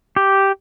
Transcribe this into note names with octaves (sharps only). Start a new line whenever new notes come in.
G4